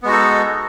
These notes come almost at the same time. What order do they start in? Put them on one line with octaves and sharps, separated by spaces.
B3 G#3 F#4 D#4 A4